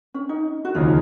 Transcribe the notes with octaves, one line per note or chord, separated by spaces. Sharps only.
C#4
D#4
F#4
D#2 C#3 F3 A#3 D#4 F4